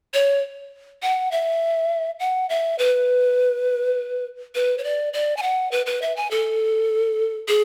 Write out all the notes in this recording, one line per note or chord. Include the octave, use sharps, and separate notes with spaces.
C#5
F#5
E5
F#5
E5
B4
B4
C#5
D5
D5
G#5
F#5
B4
B4
E5
G#5
A4
G#4